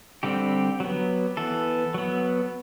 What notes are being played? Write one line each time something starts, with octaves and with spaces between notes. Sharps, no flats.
D3 G3 C4 G4
F#3 B3
E3 B3 A4
F#3 B3